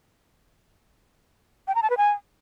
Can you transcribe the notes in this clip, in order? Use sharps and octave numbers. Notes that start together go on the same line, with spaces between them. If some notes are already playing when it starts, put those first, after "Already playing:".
G5
A#5
A5
B4
G#5